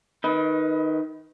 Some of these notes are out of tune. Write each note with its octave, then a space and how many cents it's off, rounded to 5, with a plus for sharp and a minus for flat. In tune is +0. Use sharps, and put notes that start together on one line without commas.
D#3 +0 B4 +0 D#5 +35